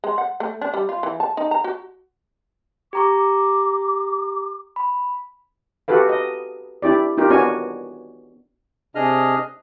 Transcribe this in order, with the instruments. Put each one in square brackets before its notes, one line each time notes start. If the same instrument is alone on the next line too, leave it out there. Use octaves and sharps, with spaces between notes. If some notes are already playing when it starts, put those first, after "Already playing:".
[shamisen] G#3
F#5
A3
D4
G3
F4
E3
A5
D#4
A#5
F#4
[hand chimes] G4 A#5 C#6 [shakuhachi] D6
[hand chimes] B5
[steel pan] F#4 G4 A4 B4 F5
D#5
D4 E4 G4 D5
D#4 F4 G4 A#4
B3 D4 F#4 C#5 G#5
[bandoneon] C3 D4 G#4 D#5 F6